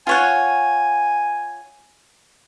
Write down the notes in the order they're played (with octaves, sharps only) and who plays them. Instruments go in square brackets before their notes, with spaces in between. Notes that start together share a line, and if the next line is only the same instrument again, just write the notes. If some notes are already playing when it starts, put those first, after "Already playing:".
[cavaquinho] F4 C#5 F#5 [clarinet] G#5